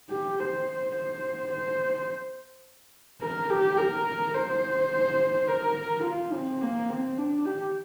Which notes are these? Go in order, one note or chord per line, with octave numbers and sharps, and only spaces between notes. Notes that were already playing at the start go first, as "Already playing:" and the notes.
G4
C5
C5
C5
A#4
G4
A#4
C5
A#4
F4
C4
A#3
C4
D4
G4